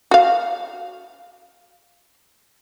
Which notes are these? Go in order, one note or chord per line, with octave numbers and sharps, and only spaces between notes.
F#4 F5